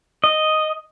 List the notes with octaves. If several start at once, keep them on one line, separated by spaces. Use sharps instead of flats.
D#5